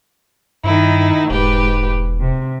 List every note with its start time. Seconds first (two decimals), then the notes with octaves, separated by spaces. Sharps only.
0.64 G2 D#3 D#4 E4
1.30 E1 G#2 G4 B4
2.20 C3